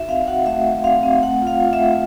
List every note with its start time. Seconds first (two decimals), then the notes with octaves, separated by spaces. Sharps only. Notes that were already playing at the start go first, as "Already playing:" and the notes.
Already playing: D#4 F#4 E5
0.09 C4 F5
0.28 F#4 F#5
0.46 A3 E5
0.66 A3
0.84 C4 F5
1.03 C4
1.23 A3 F#5
1.42 F4
1.47 F5
1.60 F4
1.73 E5
1.79 A3